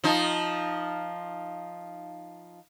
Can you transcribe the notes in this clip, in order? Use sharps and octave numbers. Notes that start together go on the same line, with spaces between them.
F3 D#4